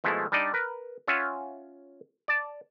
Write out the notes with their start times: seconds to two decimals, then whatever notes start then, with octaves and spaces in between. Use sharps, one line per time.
0.04 B2 F3 G#3 A3 E4
0.32 G3 D4 D#4 D5 D#5
0.54 A#4 B4
1.08 C#4 F4 C#5 E5 F#5 G#5
2.28 D5 A5